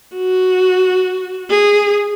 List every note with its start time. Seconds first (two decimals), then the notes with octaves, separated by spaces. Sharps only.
0.16 F#4
1.50 G#4